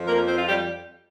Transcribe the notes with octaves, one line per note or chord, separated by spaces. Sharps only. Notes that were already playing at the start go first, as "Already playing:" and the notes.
Already playing: F2 F3
A#3 A#4
C4 C5
F4
G3 G4